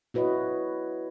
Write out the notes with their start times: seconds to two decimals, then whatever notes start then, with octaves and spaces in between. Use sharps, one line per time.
0.14 E4 F#4 B4 C#5 D#5